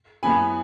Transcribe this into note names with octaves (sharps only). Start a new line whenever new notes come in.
F#2 E3 B3 G#5 B5